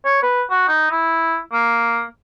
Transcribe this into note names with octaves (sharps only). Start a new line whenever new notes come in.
C#5
B4
F#4
D#4
E4
A#3